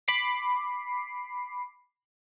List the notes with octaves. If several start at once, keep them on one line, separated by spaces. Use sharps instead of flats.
B5 D6 C7